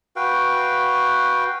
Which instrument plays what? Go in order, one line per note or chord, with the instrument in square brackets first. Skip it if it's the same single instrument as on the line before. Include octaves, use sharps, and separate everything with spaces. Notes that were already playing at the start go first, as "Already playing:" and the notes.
[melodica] F#4 B4 F5 G5